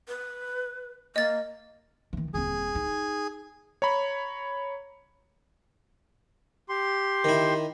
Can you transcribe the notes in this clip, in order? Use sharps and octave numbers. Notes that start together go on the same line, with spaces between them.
B4
A#3 D#5 A6
D#3 E3
D#1 C4 G#4
D#4
C#5 A#5 B5
G4 C6
D#3 E4